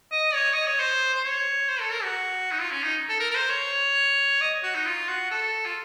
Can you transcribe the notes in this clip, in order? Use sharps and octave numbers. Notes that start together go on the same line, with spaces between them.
D#5
C#5
D#5
C#5
C5
C5
C#5
C5
A4
A#4
F#4
D#4
F4
C#4
D#4
A4
A#4
A#4
C5
C#5
D#5
F#4
D#4
F4
F#4
A4
F4